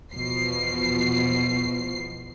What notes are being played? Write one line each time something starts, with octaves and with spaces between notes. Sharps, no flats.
E2 B2 F3 C7